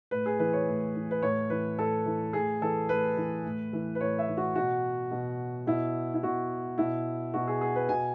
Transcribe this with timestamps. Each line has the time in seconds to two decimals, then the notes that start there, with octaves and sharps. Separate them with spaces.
0.11 A2 B4
0.26 G#4
0.39 E3 B4
0.53 C#5
0.68 A2
0.95 E3
1.11 B4
1.22 A2 C#5
1.50 E3 B4
1.78 A2 A4
2.06 E3
2.33 A2 G#4
2.62 E3 A4
2.89 A2 B4
3.17 E3
3.45 A2
3.73 E3
3.95 B4
4.01 A2 C#5
4.19 E5
4.28 E3
4.37 F#4
4.55 B2 F#4
5.11 B2
5.67 B2 E4
6.14 E4
6.23 B2 F#4
6.78 B2 E4
7.34 B2 F#4
7.48 G#4
7.61 G#4
7.76 B4
7.89 B2 G#5